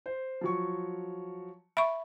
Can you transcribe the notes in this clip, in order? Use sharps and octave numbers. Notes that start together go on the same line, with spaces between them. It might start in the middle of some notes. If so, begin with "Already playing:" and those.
C5
F3 F#3 C#6
E5 B5 C#6